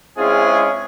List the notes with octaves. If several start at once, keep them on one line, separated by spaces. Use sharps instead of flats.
G#3 C4 C#4 E4 F4 G#4